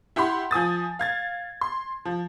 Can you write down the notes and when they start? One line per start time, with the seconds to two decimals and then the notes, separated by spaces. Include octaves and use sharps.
0.16 E4 G4 F#5 B5 C6
0.51 F3 G#5 D#6 A6
0.99 F5 G#6 A6
1.61 C6
2.05 F3